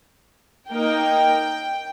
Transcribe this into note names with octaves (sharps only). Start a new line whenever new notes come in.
A#3 D#4 A#4 G5